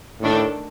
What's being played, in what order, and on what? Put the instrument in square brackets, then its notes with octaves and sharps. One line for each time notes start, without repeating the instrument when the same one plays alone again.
[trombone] A2 [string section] D#3 A3 D4 A4